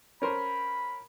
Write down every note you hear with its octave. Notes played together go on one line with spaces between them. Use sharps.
C#4 A#4 C5 B5